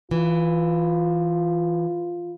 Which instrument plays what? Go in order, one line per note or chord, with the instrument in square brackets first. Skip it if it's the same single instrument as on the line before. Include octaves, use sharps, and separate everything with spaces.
[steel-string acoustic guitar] E3 [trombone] F4